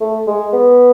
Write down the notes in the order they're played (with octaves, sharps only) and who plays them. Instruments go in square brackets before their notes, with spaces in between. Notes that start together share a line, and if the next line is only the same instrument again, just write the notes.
[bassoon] A3
G#3
B3